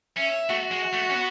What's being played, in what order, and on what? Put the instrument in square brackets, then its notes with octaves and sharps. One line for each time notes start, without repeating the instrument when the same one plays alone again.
[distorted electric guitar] C#4 [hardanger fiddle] E5
[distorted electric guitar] A3 [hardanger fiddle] F#4
[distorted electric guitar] G#3
A3
C#4
B3